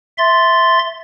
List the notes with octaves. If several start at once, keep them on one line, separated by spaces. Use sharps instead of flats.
E5 C6 A6